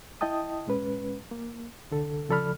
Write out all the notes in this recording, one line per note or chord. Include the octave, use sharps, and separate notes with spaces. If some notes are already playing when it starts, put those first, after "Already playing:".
E4 D#5 G5 A5 D#6
A#2 G#3 C#4 B4
A#3
C2 D3 A4
C#3 F3 A4 D5 B5 F6